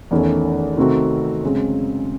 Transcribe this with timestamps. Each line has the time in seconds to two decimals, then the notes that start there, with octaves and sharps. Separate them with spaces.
0.11 E2 D#3 A3 C#4
0.77 C3 D#3 A3 C4 F#4
1.43 F#2 C#3 G#3 C4